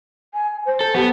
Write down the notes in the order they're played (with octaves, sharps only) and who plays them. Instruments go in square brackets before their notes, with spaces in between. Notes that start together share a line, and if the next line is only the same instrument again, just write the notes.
[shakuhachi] G#5
C5
[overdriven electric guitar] A4
[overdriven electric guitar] B3 [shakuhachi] G4